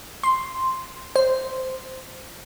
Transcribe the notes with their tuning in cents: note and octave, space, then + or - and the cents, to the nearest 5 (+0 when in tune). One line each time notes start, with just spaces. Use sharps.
C6 +0
C5 -5